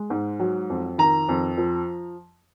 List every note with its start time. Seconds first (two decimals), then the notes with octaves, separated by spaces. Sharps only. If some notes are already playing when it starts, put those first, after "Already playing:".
Already playing: G#3
0.10 G#2
0.40 F#3
0.70 F2
0.98 D#3 A#5
1.29 F2
1.58 F3